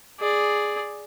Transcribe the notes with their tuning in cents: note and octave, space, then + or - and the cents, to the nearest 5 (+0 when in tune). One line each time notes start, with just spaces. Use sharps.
G#4 +0 D5 +0